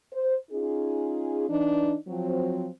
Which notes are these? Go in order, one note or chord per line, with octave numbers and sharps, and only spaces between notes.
C5
C#4 D#4 F4 G#4
E3 D4 D#4
F3 F#3 C4